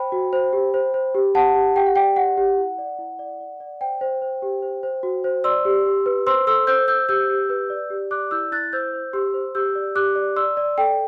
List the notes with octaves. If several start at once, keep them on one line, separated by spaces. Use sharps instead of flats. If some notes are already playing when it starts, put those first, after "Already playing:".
Already playing: C5 G5 B5
F#4
C5
G4
C5
C5
G4
G4 F#5 A5
G4
G4 G5
F#5
D5 G5
G4 F#5
G4
E4
D5
E4
D5
D5
D5
C5 G5
C5
C5
G4
C5
C5
F#4
C5
D5 C6 E6
G4
G4
B4
C5 C6 E6
A4 C6 E6
C5 E6 G6
C5 E6 G6
G4 E6 G6
G4
B4
D5
G4
D5 D6 F#6
E4 E6 G6
E4 F#6 A6
C5 E6 G6
C5
G4 C6 E6
C5
G4 E6 G6
D5
G4 D6 F#6
D5
D5 C6 E6
D5
A4 G5